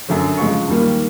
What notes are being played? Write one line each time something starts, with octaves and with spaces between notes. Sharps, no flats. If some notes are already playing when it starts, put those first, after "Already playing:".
F#2 D3 F#3
C#3 F3 G#3 C#6
D#2 D#3 G3 A#3